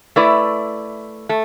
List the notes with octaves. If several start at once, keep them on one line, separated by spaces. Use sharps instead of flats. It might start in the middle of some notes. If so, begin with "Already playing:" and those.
A3 E4 B4 D5
A3